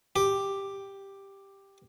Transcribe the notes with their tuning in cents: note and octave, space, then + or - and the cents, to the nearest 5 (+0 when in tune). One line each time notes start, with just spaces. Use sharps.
G4 +5